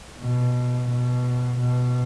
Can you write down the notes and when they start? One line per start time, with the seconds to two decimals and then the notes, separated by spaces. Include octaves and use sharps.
0.21 B2
0.91 B2
1.59 B2